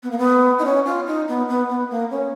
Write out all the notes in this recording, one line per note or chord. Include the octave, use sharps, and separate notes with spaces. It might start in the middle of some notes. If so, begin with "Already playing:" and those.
B3
A#3
B3
D#4
C#4
F4
D#4
B3
B3
B3
A#3
C#4